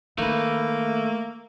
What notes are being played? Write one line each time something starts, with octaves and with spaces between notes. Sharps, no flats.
D#3 A3 A#3 B4